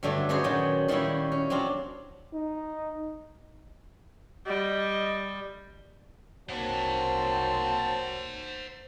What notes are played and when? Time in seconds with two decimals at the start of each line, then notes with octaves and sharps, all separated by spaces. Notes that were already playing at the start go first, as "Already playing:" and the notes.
0.03 G2 D3 F#3 A3
0.29 G#3 B3 C#4 F#4 G#4 C5
0.44 A#2 D#3 F#3 B3
0.88 D#3 G3 A#3 C#4 E4
1.32 C#4
1.50 F#3 C4 D4 F4
2.33 D#4
4.46 G3 D#5
6.49 C2 F#3 A#3 C4 C5 F#5 A5